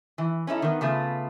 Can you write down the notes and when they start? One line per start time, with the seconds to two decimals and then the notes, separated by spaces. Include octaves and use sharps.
0.18 E3
0.47 C#4 D#4 E4 A4
0.62 D#3 B3
0.81 C#3 A3 B3 F4